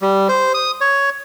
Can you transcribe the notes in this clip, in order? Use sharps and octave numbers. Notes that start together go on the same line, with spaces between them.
G3
C5
D#6
C#5